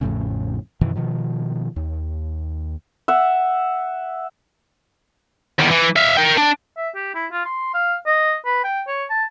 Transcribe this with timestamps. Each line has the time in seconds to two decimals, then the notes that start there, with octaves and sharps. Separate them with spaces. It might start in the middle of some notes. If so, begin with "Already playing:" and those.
0.01 A1 F2 A2 C#3
0.81 F#2 B2 D#3 E3
0.96 B2 D#3 F3
1.76 D#2
3.08 E5 F#5
5.59 E2 D#3
5.71 E3
5.96 E5 F5
6.17 A#4 G5
6.38 D4
6.77 E5
6.95 G4
7.15 E4
7.32 F4
7.45 C6
7.74 F5
8.06 D#5
8.45 B4
8.64 G5
8.87 C#5
9.10 A5